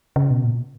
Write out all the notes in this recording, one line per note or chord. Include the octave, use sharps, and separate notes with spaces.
C#3
B2
A#2